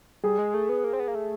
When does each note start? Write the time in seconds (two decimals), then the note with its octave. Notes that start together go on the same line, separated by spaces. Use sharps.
0.24 G3 G#4
0.39 G#3
0.54 A3
0.69 B3
0.84 A#3
0.93 C4
1.00 B3
1.08 A#3
1.15 A3